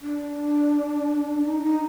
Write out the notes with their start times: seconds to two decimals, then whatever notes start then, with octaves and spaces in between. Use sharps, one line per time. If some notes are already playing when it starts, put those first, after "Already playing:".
0.01 D4
1.45 D#4
1.63 D#4